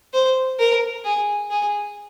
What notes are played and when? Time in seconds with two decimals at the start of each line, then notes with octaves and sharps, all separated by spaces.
0.13 C5
0.59 A#4
1.04 G#4
1.50 G#4